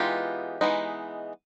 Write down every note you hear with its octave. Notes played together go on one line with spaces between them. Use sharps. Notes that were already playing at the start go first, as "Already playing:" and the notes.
Already playing: E3 G#3 B3 D#4 F4 G4
E3 G#3 B3 D#4